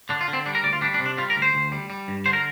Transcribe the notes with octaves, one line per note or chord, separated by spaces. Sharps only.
D3 D4
F4
D3
C4
G3 D4
A#4
D2 D5
F4
G3 D4
D4
C3
D4
G3 F4
A#4
D2
C5
D2
G3
G3
G2
D3 C5
A#4